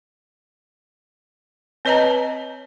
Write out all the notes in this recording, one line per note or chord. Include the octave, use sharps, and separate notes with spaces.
C4 B4 C#5 D#5 A5 A#5